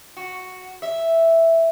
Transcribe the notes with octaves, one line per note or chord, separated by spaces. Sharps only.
F#4
E5